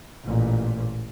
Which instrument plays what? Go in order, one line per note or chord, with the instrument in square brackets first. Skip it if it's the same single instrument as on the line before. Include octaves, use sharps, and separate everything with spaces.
[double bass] A1 A#2